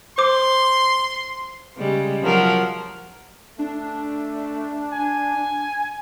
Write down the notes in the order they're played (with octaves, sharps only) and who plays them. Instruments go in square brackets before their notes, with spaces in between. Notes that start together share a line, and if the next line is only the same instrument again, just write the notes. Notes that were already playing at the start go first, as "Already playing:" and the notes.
[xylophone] C5 D6 [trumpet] C6
[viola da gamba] C#3 G3 G#3
F3 F#3 A#4
[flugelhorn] A3 [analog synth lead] D4
[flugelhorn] G#5